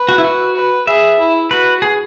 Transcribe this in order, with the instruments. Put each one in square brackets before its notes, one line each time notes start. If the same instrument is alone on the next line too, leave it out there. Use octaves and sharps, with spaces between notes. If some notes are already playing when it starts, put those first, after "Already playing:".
Already playing: [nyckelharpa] B4
[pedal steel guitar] F#4
E4
F#4
[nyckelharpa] B4
[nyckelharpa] G#4 [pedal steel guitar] E5
[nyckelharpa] E4
[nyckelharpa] F#4 [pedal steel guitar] B4
[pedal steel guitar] G#4